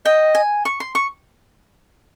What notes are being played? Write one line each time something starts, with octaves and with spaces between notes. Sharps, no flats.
D#5 G5
G#5
C#6
C6
C#6